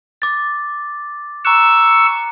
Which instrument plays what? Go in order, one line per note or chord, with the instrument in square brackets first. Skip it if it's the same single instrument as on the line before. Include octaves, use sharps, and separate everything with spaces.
[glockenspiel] D6 A6
[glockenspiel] A#5 F#6 [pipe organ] C#6 E6